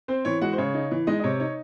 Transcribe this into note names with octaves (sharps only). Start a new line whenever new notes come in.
C4 C5
E3 C#5
G#3 F#4 F#5
C5
C#3 C#5
D#4
E3
G#3 D#4 D#5
D#5
C3 C#5
D#4 C#5